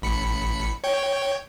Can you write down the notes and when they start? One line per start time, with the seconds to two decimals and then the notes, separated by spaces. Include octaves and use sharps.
0.02 A1 B5 C#7
0.84 C#5 G5